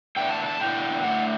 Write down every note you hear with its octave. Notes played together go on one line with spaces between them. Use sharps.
E2 D3 A3 E4 G5
A5
A5
E2 D3 A3 E4 G5
D3 A3 E4 F#5